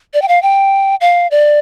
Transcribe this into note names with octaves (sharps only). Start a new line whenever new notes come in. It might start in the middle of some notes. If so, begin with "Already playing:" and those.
D5
G5
F5
G5
F5
D5